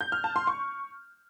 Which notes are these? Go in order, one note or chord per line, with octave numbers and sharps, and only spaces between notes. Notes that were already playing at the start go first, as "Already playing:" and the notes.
G6
F6
A5
C6
C#6